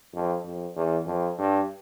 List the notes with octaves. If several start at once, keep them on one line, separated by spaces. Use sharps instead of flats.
F2
F2
E2
F2
G2